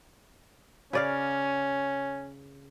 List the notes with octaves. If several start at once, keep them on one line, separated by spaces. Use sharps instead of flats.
C#3 C#4 D5 F5